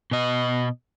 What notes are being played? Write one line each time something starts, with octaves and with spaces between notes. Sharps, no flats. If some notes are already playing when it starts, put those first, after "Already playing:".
B2 D#5